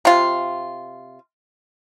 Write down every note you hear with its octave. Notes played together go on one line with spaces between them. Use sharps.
C3 F4